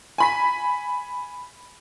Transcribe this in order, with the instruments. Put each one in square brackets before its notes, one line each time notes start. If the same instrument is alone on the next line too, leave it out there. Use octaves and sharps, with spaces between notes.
[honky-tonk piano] G#5 B5 B6